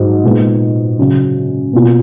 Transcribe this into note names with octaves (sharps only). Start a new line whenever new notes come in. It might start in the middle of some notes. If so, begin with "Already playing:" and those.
Already playing: G#2 F#3
A#2 G#3 B3 D#4
C#3 F#3 C#4
B2 A#3 F4